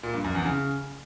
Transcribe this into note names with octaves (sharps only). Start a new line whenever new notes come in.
A#2
G2
F#2
E2
C#3